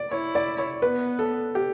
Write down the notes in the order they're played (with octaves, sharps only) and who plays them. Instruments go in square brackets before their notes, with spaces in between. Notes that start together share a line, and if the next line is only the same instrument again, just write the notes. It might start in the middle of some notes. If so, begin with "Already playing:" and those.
Already playing: [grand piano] D5
[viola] E4 [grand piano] C#5
[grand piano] D5
C#5
[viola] B3 [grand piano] B4
[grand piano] A4
G4